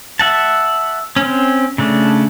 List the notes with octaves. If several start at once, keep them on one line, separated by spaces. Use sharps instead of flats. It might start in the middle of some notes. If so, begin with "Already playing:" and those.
E5 F#5 A5
C4 C#4
C#3 A3 D4